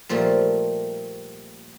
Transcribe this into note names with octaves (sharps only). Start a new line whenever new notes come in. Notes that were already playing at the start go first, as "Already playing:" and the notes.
A#2 F3 G3 A3 A#3